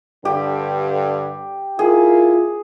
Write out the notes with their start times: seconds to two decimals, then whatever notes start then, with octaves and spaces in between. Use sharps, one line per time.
0.25 G2 D3 G4
1.79 E4 F4 G#4 A#4